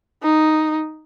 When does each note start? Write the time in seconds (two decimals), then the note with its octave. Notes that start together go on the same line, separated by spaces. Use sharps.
0.22 D#4